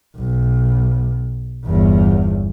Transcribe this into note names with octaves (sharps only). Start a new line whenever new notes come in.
B1
G1 E2